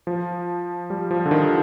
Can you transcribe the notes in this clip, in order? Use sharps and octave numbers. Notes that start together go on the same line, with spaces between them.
F3
G3
F3
D3
D#3